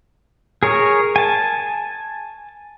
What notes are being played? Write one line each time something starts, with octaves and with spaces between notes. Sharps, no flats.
G#4 A#4 C#5
G#5 A5